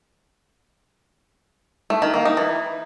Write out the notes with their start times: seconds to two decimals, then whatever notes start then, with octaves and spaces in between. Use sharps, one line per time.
1.90 A3
2.02 D#3
2.14 A#3
2.25 D#4
2.37 E3